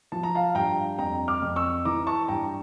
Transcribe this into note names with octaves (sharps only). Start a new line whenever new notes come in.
F3 A5
A#5
F5 A5
G2 G5 A#5
F2 G5 A#5
D6 F6
F2
C#6 E6
E3 A#5 D6
A5 C#6
G2 G5 A#5